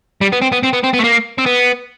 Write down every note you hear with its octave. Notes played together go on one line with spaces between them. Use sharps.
G3
B3
C4
B3
C4
B3
C4
B3
A3
A#3
C4
B3